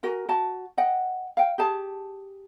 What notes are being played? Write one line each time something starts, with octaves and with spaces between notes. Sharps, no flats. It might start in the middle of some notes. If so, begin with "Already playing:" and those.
F#4 A#4 G#5
F#4 A5
D#5 F#5 G5
F5 G5
G4 G#4 A5